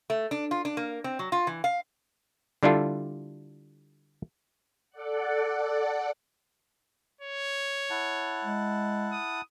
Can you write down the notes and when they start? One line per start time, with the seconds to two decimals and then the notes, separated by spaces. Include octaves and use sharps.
0.10 A3
0.31 D4
0.51 F4
0.65 D4
0.77 A#3
1.04 C4
1.19 F#3
1.32 F4
1.47 E3
1.64 F5
2.63 D3 G3 D4 E4 F4 A4
4.90 A4 D5 F#5
7.21 C#5
7.90 E4 F#5 A5
8.44 G#3
9.12 D#6